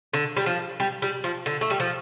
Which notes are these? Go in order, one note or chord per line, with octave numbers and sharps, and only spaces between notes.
D3
G3
F3
G3
G3
F3
D3
A3
G3
F3